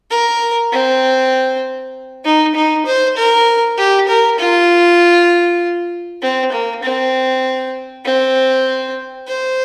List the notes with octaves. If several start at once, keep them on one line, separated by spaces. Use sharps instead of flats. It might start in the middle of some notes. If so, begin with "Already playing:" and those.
A#4
C4
D#4
D#4
C5
A#4
G4
A#4
F4
C4
A#3
C4
C4
C5